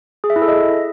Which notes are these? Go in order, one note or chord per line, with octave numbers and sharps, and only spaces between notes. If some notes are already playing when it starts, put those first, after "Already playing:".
G#4
E5
E4
A4
D#5